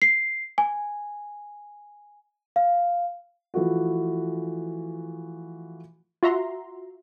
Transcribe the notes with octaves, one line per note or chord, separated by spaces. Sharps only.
C7
G#5
F5
E3 F3 A3 F#4
F4 F#4 E5 A#5 C6